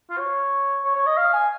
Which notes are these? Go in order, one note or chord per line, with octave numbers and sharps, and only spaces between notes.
F4
C#5
C#5
C#5
D#5
F5
G#5